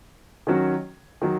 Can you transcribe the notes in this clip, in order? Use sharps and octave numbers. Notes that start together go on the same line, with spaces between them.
D#3 F#3 C#4 F#4
D#3 F#3